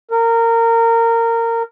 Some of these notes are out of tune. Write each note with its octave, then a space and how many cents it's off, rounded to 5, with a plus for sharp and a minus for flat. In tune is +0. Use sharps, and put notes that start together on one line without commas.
A#4 -20